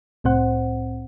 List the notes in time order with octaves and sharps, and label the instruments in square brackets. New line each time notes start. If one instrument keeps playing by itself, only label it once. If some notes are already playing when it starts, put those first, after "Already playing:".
[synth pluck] C2 A2 C4 C5 F#5